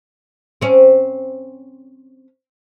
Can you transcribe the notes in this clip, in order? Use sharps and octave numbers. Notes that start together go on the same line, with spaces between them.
C4 C#4